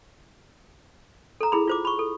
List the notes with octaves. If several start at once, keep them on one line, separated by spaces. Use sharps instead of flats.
A4 A#5
E4 G#4 B5
F4 C5 D6
B5 C#6
A4